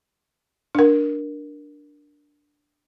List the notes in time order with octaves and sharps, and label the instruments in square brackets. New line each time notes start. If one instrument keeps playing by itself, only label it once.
[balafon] D4 A#4